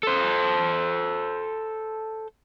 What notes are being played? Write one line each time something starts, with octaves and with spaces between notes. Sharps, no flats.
A4 C5